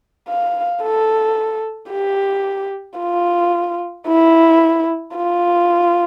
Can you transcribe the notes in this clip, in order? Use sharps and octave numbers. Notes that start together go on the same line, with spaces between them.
F5
A4
G4
F4
E4
F4